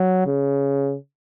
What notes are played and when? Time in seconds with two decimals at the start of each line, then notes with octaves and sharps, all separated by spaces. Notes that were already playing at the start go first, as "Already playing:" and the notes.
Already playing: F#3
0.27 C#3